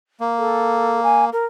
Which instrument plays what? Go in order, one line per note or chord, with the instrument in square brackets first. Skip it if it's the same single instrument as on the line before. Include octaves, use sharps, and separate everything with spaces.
[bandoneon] A#3
[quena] A4
G#5
A#4